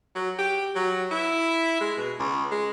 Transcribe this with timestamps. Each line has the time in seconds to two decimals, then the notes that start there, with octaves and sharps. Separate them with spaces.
0.15 F#3
0.38 G4
0.75 F#3
1.11 E4
1.80 G#3
1.97 B2
2.19 C#2
2.51 G#3